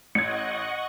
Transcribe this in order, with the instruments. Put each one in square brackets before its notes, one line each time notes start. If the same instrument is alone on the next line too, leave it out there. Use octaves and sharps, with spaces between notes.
[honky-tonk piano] A1 G#6 [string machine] D#5 F#5 C#6 [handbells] C#7